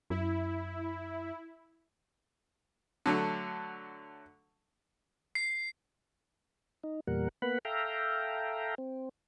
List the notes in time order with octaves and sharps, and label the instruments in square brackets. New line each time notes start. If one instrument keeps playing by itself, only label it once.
[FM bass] F#2 [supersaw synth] E4
[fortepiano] D3 F#3 A3
[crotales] C7
[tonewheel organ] D#4
E2 A#2 G3 A#4 F#5
A#3 B3 B4 F#5 B5
A4 E5 F5 G5 A#5
C4